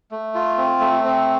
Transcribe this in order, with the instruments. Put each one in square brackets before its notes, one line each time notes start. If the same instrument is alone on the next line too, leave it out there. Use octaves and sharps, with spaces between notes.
[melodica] A3
F4
C4
A3
C4